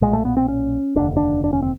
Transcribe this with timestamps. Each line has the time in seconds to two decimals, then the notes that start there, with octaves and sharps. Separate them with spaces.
0.01 B1 A#2 G#3
0.13 A3
0.25 B3
0.37 C4
0.48 C#4
0.96 F1 D#2 D3 D4
1.17 D4
1.44 D4
1.53 C#4
1.62 C4